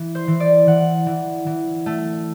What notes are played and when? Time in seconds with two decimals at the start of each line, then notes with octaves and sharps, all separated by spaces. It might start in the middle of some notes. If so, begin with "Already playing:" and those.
Already playing: E3
0.15 C5
0.28 E3
0.40 D5
0.67 E3 F#5
1.06 E3
1.46 E3
1.86 A3